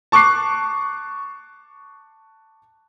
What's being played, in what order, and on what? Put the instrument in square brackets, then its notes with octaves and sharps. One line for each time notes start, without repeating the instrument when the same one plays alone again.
[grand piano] A5 C#6 D6 F#6 C7